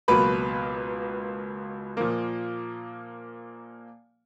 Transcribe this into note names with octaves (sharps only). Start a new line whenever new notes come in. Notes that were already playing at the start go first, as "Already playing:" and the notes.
C#2 B2 F#3 A#3 B4 B5
A#2 F3 A#3